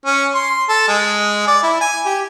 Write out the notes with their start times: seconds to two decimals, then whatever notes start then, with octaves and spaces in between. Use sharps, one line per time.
0.06 C#4
0.34 C6
0.69 A4
0.88 G#3
1.48 D5
1.63 E4
1.81 G#5
2.06 G4